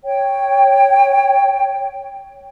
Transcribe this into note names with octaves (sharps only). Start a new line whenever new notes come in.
C#5 G5